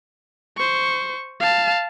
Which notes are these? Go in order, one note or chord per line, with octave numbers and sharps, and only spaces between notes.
C5 C#6
F5 A5